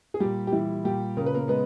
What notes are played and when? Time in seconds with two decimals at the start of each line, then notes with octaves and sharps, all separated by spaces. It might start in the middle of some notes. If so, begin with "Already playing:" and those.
0.14 G#4
0.20 A#2 G3 G4
0.47 G4
0.52 E3 G3 E4
0.84 A#2 G3 G4
1.17 C#3 A#4
1.26 B4
1.35 A#3 A#4
1.48 G#3 B3 B4